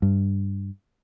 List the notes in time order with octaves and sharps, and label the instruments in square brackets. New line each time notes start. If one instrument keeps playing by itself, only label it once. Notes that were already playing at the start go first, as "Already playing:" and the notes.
[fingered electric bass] G2